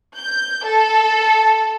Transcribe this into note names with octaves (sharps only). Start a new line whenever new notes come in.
G6
A4